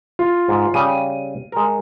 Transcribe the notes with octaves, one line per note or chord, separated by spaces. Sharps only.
F4
G#2
C#3 G3 D#7
G#3 A#4